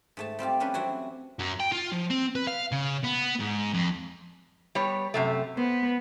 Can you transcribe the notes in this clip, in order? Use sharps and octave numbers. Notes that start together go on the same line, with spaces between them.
G#2 A3 A5
G3 C4 F4 G4
F3 G3 C#4 D4 B4
E3 F#3 C4 D4 E4 F#4
F#2
G5
F4
F3
C4
B4
F5
C#3
B3
G#2
F2
G3 B3 C#5
F#2 C3 A3
B3 C5